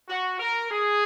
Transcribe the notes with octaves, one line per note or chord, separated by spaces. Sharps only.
F#4
A#4
G#4